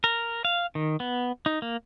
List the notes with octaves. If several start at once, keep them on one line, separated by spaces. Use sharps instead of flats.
A#4
F5
D#3
B3
D#4
A#3